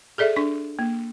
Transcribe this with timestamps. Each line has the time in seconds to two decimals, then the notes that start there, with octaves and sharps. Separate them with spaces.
0.18 G#4 A4 D5 E5
0.36 D4 C#6
0.79 A#3